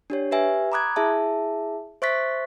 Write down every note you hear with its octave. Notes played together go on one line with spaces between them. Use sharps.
D4 G4 C#5
G4 B4 E5 G#5
A#5 B5 D6 D#6 F#6 G#6
E4 G#4 E5 A5
C5 E5 C#6 F#6 A6 B6